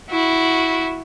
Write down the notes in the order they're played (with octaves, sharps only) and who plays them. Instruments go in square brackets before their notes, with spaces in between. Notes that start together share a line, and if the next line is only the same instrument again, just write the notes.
[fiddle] E4 F#4